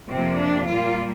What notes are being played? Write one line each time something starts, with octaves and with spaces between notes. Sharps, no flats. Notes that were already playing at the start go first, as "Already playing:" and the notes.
F2 C3 F3 A#3 C4
D4
A#2 G3 A#3 F4